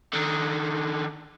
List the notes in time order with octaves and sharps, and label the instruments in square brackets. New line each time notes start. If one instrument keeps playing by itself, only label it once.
[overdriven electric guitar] D3 D#3